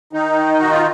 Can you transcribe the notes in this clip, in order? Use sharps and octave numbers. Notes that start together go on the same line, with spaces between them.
D#3 D#4
F#4
F4